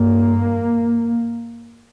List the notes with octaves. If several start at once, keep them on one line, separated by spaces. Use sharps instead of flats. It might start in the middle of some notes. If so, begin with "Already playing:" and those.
Already playing: G2 A#3